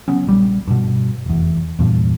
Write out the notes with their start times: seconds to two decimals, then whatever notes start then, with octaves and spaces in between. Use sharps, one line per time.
0.08 C#3 F#3 B3 C#4
0.27 A#1 G3
0.68 G2 B2
1.26 F1 E2
1.79 E2 G2 A#2